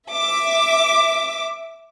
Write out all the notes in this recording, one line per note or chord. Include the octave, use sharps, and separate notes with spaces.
E5 D6